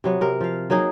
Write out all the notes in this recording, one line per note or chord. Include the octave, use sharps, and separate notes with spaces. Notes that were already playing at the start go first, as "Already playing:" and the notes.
C3 F#3 B3
C3 A#4
F3 F5
F#3 A#3 D#4 G#4